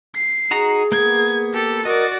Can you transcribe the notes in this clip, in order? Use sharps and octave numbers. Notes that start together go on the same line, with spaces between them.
C7
D#4 F#4 G#4 A#5
A#3 B3 G#6
G4 A4
F#4 A#4 D5 D#5